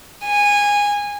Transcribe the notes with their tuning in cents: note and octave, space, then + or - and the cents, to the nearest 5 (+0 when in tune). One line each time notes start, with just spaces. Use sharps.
G#5 -15